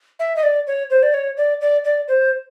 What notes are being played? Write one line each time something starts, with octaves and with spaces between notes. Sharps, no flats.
E5
D#5
D5
C#5
C5
D5
C#5
D5
D5
D5
C5